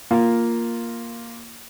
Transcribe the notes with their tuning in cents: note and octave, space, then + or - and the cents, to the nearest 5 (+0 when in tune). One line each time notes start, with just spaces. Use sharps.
A#3 +0 F4 +0